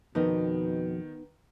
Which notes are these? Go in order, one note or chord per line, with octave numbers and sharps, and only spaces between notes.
F2 B2 D#3 B3 D#4